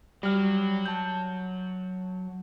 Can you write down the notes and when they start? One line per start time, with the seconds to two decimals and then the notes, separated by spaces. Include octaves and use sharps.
0.23 F#3 G3 F6
0.86 A5 G6